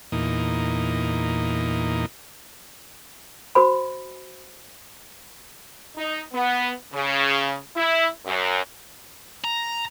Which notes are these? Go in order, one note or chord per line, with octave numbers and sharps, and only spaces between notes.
E2 A#2 D#4
F#4 C5 B5
D#4
B3
C#3
E4
F#2
A#5